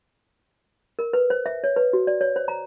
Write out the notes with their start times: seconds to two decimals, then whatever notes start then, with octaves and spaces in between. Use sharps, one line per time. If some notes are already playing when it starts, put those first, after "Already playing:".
0.99 A#4
1.13 B4
1.30 C5
1.46 E5
1.64 C#5
1.76 B4
1.93 F#4
2.07 D5
2.21 C#5
2.36 C5
2.48 A#5